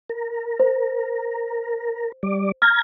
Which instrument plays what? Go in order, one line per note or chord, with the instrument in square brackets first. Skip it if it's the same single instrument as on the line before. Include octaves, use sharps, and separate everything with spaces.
[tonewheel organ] A#4
[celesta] C5
[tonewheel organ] G3 D5
[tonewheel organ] A#5 G#6 [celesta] F6